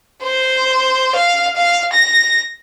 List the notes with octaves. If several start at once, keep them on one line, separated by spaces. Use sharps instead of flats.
C5
F5
F5
A#6